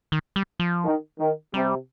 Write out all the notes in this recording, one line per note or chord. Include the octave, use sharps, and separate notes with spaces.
D#3
G3
F3
D#3
D#3
C3 G3